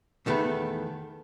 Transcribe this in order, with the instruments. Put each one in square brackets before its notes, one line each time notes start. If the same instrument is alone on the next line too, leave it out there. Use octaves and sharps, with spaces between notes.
[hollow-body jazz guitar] E2 D#3 A3 B3 B4